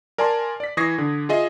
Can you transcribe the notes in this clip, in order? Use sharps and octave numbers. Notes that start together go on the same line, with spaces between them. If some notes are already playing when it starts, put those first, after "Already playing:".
A#4 D5 G#5 A5 C6
D5 B6
E3 C#6 D#6 G#6 A#6 C7
D3
F4 G#4 D#5 E5